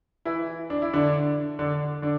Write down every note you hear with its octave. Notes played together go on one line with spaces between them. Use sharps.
E3 E4
D4
E4
D3 D4
D3 D4
D3 D4